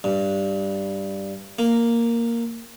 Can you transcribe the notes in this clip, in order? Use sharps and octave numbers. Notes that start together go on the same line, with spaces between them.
G2
A#3